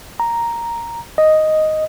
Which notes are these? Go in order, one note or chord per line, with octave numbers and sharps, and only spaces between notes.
A#5
D#5